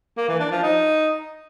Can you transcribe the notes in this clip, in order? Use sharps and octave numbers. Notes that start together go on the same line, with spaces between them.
A#3
E3
D4
F3
D#4